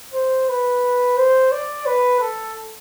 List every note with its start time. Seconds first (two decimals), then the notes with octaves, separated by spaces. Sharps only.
0.14 C5
0.49 B4
1.17 C5
1.52 D5
1.86 B4
2.20 A4